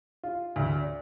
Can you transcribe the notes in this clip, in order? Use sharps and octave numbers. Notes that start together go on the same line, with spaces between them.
F4
D2
D4